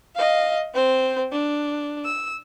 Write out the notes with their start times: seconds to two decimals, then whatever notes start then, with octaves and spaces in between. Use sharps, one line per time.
0.15 D#5 F5
0.74 C4 C5
1.32 D4
2.05 E6